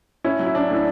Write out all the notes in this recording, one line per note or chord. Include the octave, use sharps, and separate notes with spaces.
A2 C#4 E4
F#3
E4
C#4 D4
A2
D4